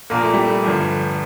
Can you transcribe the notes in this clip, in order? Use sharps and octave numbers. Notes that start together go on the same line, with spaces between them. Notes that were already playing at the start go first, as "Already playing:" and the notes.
A#1 A#2 F3 A#3
A3
G3
A3
G1 G2 F3